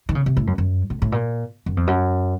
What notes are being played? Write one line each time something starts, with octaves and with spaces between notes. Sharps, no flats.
D#3
C#3
C3
A2
F#2
F#2
A2
A2
A#2
F#2
F2
F#2